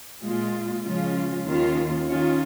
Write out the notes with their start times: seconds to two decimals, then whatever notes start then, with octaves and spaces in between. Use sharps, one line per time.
0.23 A#2 G#3 F4
0.84 C#3 F3 G#3 C#4 F4
1.45 D#2 D#3 C#4 F4
2.06 D#3 C#4 F4